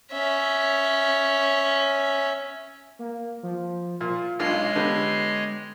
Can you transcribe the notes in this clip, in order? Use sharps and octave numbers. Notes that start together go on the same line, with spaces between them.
C#4 E5
A#3
F3
A#2 F4
B1 G#3 D4 F4 C#5 D#5 C7
D3 B3 G4